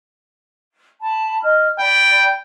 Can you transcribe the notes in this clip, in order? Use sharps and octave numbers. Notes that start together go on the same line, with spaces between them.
A5 B5
D#5 F6
D5 G5 B5